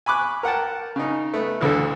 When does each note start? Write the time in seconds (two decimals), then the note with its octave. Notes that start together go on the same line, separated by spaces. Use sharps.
0.06 G#5 B5 C#6 D6 F#6
0.43 A#4 F#5 G5 A5
0.96 C#3 D#4
1.34 A3 B3
1.61 A1 D2 D3 A4